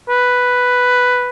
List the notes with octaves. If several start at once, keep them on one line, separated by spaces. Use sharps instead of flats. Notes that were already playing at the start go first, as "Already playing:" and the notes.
B4